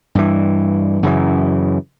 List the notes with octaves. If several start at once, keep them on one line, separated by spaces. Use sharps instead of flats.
G2 E3
F#2 C#3 E3